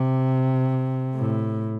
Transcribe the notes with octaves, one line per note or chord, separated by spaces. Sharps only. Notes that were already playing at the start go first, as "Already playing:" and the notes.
Already playing: C3
A2